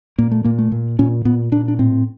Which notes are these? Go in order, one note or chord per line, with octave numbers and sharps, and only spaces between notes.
A#2 A#3
A3
A#2 A#3
A3
A#2
A#2 C#4
A#2 B3
A#2 D4
D4
A2 C4